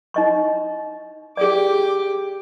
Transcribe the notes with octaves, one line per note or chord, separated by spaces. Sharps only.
D#4 D#5 C#6
G4 G#4 D5 D6